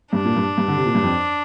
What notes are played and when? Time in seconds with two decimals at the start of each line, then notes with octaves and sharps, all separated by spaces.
0.13 G2 D4
0.25 A#2
0.37 G2
0.58 G2
0.68 D3
0.77 C3
0.86 A#2
0.95 G2
1.03 F2